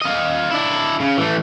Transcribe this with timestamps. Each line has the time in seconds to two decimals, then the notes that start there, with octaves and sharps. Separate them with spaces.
0.01 F4 D#5
0.52 D4 E4
1.00 C#3
1.18 E3 A3